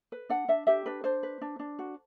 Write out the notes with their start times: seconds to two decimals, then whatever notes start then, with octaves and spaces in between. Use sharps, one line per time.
0.12 B4
0.29 D4 F#5
0.48 D4 E5
0.67 G4 E5
0.86 D4 B4
1.04 D4 C5
1.23 B4
1.41 D4
1.59 D4
1.79 F#4